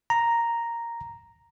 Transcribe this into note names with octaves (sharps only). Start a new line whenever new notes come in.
A#5